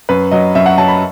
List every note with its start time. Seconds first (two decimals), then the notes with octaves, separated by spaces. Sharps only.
0.09 F#2 B4
0.31 F#3 D#5
0.55 F#2 E5
0.66 F#5
0.78 F#3 A5
0.88 B5